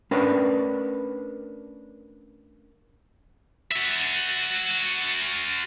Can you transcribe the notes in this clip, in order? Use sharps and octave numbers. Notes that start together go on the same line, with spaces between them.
A3 C#4 D4 A#4 B4
F#4 E5